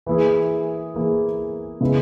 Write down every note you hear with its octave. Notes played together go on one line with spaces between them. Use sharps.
E3 A#3 E4 G#4
E3 A#3 E4 G#4
C#3 G#3 B3 E4 G#4